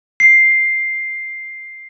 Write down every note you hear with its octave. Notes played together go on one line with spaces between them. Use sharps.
C7
C7